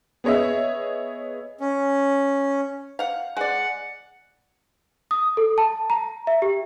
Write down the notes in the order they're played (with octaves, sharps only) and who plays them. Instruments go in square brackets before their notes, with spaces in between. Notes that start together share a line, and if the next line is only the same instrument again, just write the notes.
[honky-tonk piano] B3 G#4 C#5 D#5 E5
[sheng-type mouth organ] C#4
[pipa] F5 F#5
[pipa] G#3 D5 [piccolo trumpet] F#5
[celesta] D#6
A4
A5
A#5
E5
G4